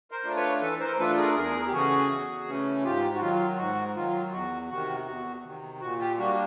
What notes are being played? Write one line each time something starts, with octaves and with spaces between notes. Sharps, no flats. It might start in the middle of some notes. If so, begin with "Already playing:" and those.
A#4 C5
A3 D4 F4
B4 C#5
E3 A4 B4
A#4 C5
A3 D4 F4 A4 B4
G#4 A#4
E2 G#4 A#4
G4
C#3 E3 A3 C#4 F#4 G#4
E2
C#3 E3 A3 C#4
G#2 F4 G4
F#4
D#3 F#3 F4
G#2 F#4
D#3 F#3 F4
E2 F#4
C3 D#3 F#4
E2 F#4
C3 D#3
A#2 F#4
F4 G4
G3 A#3 D4 F#4